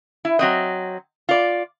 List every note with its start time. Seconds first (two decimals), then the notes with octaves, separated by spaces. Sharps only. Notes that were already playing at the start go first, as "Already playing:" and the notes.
0.25 E4
0.39 F#3 C4 D#5
1.29 F4 D5